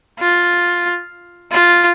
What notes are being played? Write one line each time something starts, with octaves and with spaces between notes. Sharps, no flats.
F4
F4